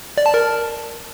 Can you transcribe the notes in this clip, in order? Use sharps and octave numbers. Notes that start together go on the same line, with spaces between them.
D5
A5
A#4